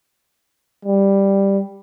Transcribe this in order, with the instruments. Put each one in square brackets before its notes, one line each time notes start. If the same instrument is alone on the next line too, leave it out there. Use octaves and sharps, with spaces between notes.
[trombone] G3